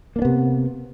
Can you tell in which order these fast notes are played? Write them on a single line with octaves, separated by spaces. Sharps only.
A#3 D4 B3 C3